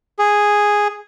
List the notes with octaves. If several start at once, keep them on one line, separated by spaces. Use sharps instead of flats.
G#4